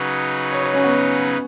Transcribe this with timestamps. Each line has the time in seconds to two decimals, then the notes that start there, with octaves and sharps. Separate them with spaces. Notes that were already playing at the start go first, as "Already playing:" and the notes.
Already playing: C#3 F#3 D#4 B4
0.52 C#5
0.63 C#5
0.74 C#4
0.84 B3